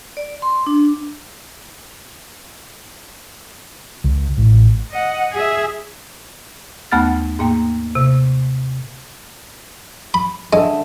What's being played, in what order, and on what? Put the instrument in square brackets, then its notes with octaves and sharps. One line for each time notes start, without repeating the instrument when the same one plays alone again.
[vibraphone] D5
C6
D4
[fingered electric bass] C#2
A1
[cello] D#5 F#5
G#4 E5
[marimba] D#2 A3 B3 F#5 F6 A6
G#2 A#3 G5
C3
[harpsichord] B5
[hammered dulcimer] D3 E5 [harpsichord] G#3